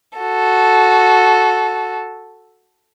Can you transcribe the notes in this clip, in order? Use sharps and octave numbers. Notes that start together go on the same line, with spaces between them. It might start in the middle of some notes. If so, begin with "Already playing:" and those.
F#4 A4